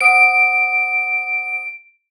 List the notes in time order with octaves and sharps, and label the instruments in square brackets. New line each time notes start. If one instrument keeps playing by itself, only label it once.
[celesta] C5 F#5 D#6 [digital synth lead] D7